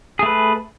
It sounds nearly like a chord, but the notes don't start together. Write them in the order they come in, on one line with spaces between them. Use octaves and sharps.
G#4 A3 B4